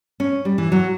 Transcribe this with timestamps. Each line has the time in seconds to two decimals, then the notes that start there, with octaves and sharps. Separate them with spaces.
0.20 C#4
0.45 G3
0.58 E3
0.72 F#3